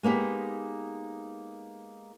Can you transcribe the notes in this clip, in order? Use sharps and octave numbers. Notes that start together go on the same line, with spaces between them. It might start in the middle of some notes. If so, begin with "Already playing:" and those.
G#3 A#3 B3 D#4 G4